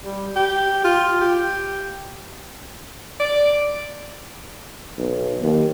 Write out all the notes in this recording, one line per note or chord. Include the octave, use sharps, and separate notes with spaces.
G3
G4
F4
G4
D5
B1
D#2